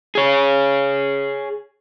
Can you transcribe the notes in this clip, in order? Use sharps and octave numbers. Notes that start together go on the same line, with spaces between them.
G#4 C#5